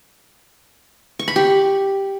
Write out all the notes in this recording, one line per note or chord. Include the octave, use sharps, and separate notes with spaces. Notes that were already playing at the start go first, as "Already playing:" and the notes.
C#6
B5
G4